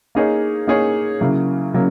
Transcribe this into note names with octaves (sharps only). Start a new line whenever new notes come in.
A#3 D#4 G#4 C#5
A#3 D#4 G#4 C#5
C#3 F#3 A#3 E4
C#3 F#3 A#3